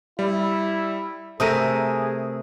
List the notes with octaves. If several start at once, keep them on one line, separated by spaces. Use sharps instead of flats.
G3 E4
C3 A3 G#4 A#4 D#6 D#7